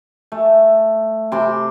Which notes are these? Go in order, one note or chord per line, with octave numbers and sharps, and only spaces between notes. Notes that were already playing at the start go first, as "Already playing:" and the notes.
A3
C3 C6 D6